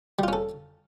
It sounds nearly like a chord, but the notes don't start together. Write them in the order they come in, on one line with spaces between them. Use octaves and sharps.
G3 F4 C#4 A4